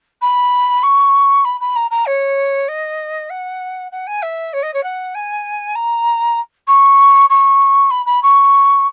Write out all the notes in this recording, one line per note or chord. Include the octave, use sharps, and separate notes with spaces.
B5
C#6
B5
B5
A#5
A#5
C#5
D#5
F#5
F#5
G#5
E5
C#5
D#5
C#5
F#5
G#5
A#5
C#6
C#6
B5
B5
C#6